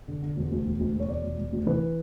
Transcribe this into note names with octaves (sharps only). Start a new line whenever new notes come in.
D3
D3
E1
D2
E1
D2
E1
C#5
E1 D5
E1
E1
D2
E3 B4